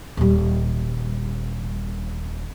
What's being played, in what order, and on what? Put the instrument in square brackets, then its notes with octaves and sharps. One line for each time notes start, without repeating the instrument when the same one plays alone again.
[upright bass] D#1 G3